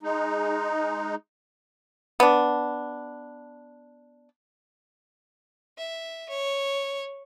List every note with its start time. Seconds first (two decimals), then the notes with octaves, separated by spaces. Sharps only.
0.03 G#3 D#4
2.20 B3 D4
5.78 E5
6.29 C#5